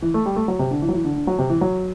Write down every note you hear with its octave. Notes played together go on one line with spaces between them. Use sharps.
E3
A3
G3
A3
F#3
C3
D3
E3
F#3
E3
D3
D3
F#3
C3
E3
F#3